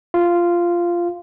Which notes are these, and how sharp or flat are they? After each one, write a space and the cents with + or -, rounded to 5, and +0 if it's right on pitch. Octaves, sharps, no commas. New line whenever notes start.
F4 -10